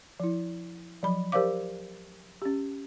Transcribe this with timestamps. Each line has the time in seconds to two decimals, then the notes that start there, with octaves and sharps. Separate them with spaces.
0.20 F3 E4
1.03 F3 F#3 B5
1.32 G4 A#4 C5 D5 F5 D6
2.42 C#4 G4